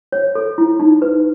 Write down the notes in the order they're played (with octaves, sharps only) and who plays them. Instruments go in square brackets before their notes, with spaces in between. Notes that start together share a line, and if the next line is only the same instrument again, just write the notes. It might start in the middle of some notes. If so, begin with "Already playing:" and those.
[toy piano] C#5
A4
E4
D#4
B4